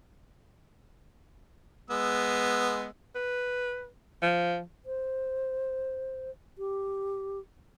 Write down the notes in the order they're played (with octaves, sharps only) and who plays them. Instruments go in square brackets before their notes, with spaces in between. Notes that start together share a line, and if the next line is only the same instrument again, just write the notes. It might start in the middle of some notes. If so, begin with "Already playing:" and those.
[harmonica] G#3 B3 E6
[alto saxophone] B4
F3
[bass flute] C5
G4